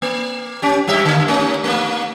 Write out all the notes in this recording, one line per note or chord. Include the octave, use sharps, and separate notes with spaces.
A#3
C#4 G4
G2 G4 E5
D3 A#3
A3 C#4 D#4
A3 A#3